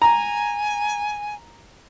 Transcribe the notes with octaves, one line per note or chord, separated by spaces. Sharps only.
G#5 A#5